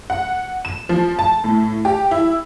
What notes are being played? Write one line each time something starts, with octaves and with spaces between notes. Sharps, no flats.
F#5
E7
F3
A5
A2
G4
E4